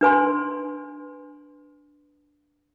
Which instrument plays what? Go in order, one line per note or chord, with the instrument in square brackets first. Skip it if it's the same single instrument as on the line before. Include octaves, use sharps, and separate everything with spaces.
[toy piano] D4 B4 G#5 C6